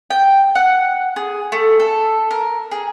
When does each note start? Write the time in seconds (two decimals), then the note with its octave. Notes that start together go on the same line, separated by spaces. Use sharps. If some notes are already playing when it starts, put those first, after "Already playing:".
0.10 G5
0.55 F#5
1.16 G#4
1.52 A3
1.80 A4
2.31 A#4
2.71 G#4